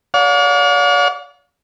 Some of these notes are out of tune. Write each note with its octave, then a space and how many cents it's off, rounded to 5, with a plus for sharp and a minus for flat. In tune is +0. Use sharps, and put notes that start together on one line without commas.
D5 -45 F5 +45